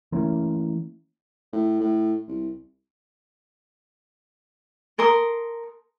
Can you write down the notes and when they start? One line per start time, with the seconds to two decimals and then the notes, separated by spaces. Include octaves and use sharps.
0.12 E3 A3 A#3 C#4
1.53 A2
1.80 A2
2.28 C2
4.98 A4 A#4 C6 D#6